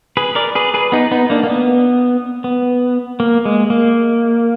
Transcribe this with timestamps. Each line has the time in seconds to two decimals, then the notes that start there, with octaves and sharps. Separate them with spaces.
0.17 G#4 B4
0.35 A#4 D5
0.55 G#4 B4
0.74 G#4 B4
0.92 B3 D#4
1.11 B3 D#4
1.30 A#3 D4
1.43 A#3
1.50 B3
2.44 B3
3.20 A#3
3.45 G#3
3.70 A#3